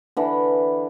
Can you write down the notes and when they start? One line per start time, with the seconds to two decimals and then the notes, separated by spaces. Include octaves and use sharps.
0.17 D3 E3